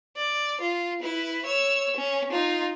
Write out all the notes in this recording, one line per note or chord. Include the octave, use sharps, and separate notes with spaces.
D5
F4
E4 B4
C#5 E6
C#4
D#4 F4